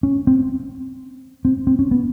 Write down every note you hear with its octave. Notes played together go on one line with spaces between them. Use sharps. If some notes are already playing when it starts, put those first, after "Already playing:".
C#4
C4
C4
C4
C#4
B3